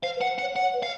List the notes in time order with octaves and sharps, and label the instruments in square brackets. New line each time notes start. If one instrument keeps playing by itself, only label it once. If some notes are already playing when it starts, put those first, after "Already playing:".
[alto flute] C5 [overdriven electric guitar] F5
[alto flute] B4
[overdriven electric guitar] F#5
[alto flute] C5
[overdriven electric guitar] F#5
[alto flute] C#5
[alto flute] C#5 [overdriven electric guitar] F#5
[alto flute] B4
[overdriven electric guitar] F5